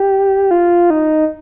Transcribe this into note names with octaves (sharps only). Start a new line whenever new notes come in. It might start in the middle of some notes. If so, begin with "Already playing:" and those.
Already playing: G4
F4
D#4